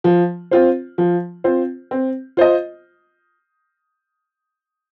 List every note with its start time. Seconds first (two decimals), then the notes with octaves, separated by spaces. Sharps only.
0.04 F3
0.51 C4 F4 C5
0.98 F3
1.44 C4 F4 C5
1.91 C4
2.37 F4 C5 D#5